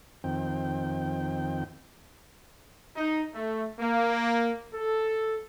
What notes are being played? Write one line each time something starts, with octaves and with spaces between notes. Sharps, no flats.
F2 D#3 C4 G5
D#4
A3
A#3
A4